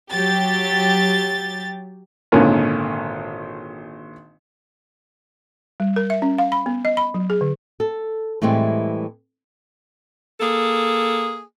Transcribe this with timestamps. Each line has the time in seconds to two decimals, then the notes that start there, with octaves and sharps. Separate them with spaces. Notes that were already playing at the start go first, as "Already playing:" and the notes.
0.11 F#3 G4 A6
2.32 G#1 A#2 D3 D#3 C#4 A#4
5.80 G3
5.96 A#4
6.10 E5
6.22 C#4
6.38 F5
6.52 B5
6.66 B3
6.85 D#5
6.97 B5
7.14 F#3
7.30 G#4
7.41 D3
7.80 A4
8.42 A2 E3 G3 G#3 C4
10.40 A#3 G#4 A4